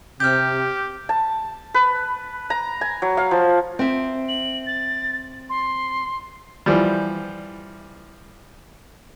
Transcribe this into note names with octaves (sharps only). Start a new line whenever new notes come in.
C3 G4 F6 G6
A5
B4
A#5
G#5
F#3
F5
F3
C4 E5
F#7
A6
C6
E3 F3 G3